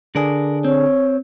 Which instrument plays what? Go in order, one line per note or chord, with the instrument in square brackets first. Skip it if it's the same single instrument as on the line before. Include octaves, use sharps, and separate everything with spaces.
[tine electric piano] D3 D4 G#4 [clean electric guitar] A#4 B4
[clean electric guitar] C4 [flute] C#5